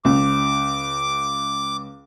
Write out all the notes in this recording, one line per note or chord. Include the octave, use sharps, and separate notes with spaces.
C#2 D6